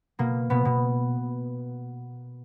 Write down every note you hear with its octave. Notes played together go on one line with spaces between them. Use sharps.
B2 A#3
B2 B3
B2